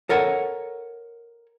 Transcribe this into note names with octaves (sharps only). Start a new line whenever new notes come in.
A4 A#4 C#5 F#5